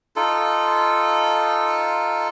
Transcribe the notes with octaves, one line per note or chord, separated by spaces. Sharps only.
D#4 F4 A4